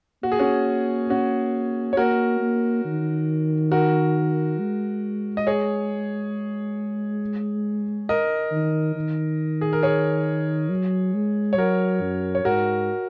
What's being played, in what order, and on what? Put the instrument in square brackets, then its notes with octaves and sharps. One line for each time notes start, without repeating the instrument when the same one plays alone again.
[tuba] A#3 [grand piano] F#4
[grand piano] G#4
C#4 F#4
C#4 F#4
C#5
[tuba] A#3 [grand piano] F#4 A#4
[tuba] A#3
D#3
[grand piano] F#4 A#4
[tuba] G#3
[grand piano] D#5
G#4 C#5
A#4 D#5
[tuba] D#3
D#3
[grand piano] G#4
A#4
G#4 C#5
[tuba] F#3
G#3
[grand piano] C#5
[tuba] F#3 [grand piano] F#4 A#4
[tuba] F#2
[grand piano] C#5
[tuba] G#2 [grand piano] F#4 A#4